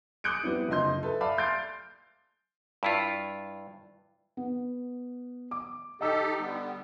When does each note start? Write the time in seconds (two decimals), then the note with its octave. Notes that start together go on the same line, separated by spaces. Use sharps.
0.24 D6 D#6 F#6 G6 C#7 D7
0.43 G3 B3 C4 E4
0.69 F#1 D3 F4 D#5 C6 G6
1.03 A4 B4 E5
1.21 D5 E5 F5 A5 B5 D6
1.37 C6 F6 G6 A6 C7 D7
2.83 G2 E4 F4
4.37 B3
5.51 D6
6.01 D#4 G4 A4 D#5 E6
6.39 D3 G3 B3